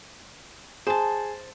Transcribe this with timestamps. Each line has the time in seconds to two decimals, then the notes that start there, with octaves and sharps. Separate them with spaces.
0.87 G#4 C5 A5